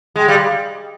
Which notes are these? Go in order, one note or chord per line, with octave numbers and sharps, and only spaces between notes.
G#3 G5
G3 F5